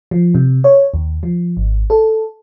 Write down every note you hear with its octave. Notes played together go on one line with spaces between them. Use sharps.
F3
C3
C#5
D#2
F3
G#1
A4